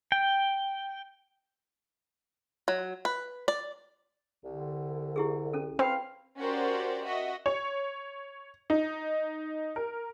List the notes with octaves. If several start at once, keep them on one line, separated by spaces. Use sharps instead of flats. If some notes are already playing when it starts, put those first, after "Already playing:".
G5
F#3
B4
D5
C2 D3
E4 G4 G#4
C#4 A4
C4 B4 C5 F5 G5 B5
C#4 F#4 G4 A#4 C5 D5
F#4 D#5 E5
C#5
D#4
A#4